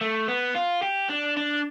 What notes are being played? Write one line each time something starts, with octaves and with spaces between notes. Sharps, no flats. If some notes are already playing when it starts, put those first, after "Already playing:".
A3
B3
F4
G4
D4
D4